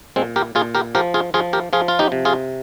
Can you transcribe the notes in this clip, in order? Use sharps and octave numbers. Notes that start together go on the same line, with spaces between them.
A#2 G#3 C4
G4 A#4
A#2 F4 G#4
G4 A#4
F3 G4 A#4
F4 G#4
F3 F4 G#4
G4 A#4
F3 F4 G#4
F4
D#4 G4
C3
F4 G#4